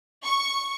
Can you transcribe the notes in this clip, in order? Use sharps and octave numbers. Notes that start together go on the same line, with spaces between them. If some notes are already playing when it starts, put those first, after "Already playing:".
C#6